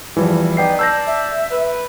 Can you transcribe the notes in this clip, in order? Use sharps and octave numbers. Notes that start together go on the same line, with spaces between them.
E2 E3 F3 G3
B3 D#4 D5 G5 C7
D5 A5 E6 G6 A#6
E5
B4